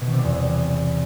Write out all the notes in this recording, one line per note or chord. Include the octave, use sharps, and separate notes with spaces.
B2
D#3
C3
G3
E2